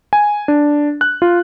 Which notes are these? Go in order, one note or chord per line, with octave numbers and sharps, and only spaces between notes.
G#5
D4
F#6
F4